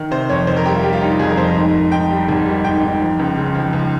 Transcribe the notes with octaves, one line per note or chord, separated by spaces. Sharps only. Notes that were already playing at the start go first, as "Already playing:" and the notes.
Already playing: D#3
C3 C5
F2 C#5
F2 C5
A#4
G3 G4
F4
G3 G4
F4
G3 D#4
F4
F2 G#4
A#4
F2 C5
A#4
G#2
G#2
G#2 G5
G3
G#1
G3
G#2 G5
G#2
F3
C#2
C#3
F3
C#2